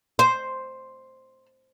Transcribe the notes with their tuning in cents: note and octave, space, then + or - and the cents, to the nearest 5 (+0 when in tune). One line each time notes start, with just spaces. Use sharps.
C5 +0